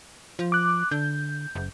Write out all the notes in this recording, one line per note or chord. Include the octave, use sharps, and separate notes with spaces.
F3
D6 F#6
D3 G6
F#1